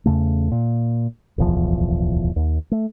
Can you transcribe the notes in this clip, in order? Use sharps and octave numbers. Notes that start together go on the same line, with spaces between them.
E2 C#3 A3
A#2
D1 B1 E2 F3
D#2
A3